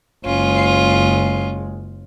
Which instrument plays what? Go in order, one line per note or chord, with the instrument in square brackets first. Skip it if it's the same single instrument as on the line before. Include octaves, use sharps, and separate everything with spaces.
[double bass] F#1 G#3 [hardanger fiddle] C#4 F4